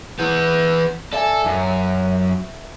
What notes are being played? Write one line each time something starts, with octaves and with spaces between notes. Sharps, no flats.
E3 B3 G6
A4 D5 E5 G#5
F#2 E5